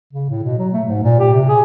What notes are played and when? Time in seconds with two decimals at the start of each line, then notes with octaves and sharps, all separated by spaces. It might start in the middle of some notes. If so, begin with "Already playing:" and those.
0.13 C#3
0.30 A2
0.44 B2
0.58 F#3
0.73 A3
0.86 G#2
1.03 A#2
1.19 G4
1.33 C3
1.48 G#4